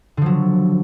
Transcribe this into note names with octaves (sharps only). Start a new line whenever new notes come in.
D3 F3 F#3